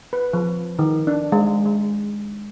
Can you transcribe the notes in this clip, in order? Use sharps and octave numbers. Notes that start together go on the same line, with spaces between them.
B4
F3
D#3
D4
G#3
G#3